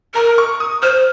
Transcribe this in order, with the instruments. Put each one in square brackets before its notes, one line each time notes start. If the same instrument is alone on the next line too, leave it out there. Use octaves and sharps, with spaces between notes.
[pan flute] A#4 [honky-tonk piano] A#5
[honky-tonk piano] C#6
D#6
[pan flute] C5 [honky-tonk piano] F6